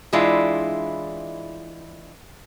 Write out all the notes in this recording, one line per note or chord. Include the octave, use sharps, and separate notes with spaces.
E3 G#3 D4 E4 F4